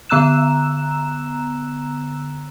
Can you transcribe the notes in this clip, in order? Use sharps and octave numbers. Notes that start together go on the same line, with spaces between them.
D3 B3 A#5 E6 F#6 E7